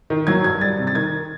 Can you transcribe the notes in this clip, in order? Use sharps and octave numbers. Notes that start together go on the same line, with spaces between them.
D#3
F#3 G#6
G2 G#6
G3 A6
C3
A6
D#3 G#6